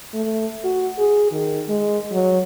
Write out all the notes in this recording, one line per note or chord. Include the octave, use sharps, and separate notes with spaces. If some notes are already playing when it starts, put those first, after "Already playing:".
A3
F#4
G#4
D#3
G#3
F#3